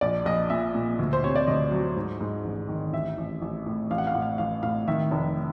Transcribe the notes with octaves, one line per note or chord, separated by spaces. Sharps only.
A#1 D5
A#1 D#5
A#2 E5
A#2
D2
C5
C3 C#5
D5
D2 D#5
F#3
G#2
G#2
A1
D#3
A1 E5
A1
A1
A2
A1 F5
F#5
F5
A2 F#5
F5
A1 F5
A2 F5
D#3 E5
F1